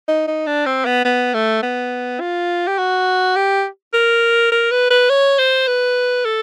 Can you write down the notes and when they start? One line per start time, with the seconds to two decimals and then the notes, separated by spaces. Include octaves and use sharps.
0.08 D#4
0.28 D#4
0.47 D4
0.66 C4
0.86 B3
1.05 B3
1.34 A3
1.63 B3
2.20 F4
2.67 G4
2.78 F#4
3.36 G4
3.94 A#4
4.52 A#4
4.71 B4
4.90 B4
5.10 C#5
5.39 C5
5.67 B4
6.25 A4